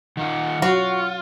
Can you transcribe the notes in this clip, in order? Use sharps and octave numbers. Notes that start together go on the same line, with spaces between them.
D#3 D#4 F4 F#5
F#3 F4 F#4